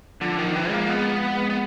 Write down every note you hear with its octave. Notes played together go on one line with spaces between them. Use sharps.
D3 F3
D#3
F3
E3
G#3
A#3
G#3 B3
G#3
G#3
B3